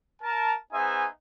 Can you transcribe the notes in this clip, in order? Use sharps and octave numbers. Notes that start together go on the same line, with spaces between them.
A#4 A5
B3 D#4 G#4 C5 E5 G#5